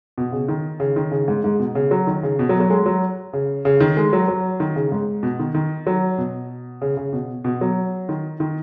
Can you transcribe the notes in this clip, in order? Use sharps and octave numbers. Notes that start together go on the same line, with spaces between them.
B2
C#3
D#3
C#3
D#3
C#3
G#2
G#2
B2
C#3
F#3
D#3
C#3
B2
F#3
F#3
G#3
F#3
C#3
C#3
D#3
G#3
F#3
F#3
D#3
C#3
G#2
B2
D#3
D#3
F#3
B2
C#3
C#3
B2
B2
F#3
D#3
D#3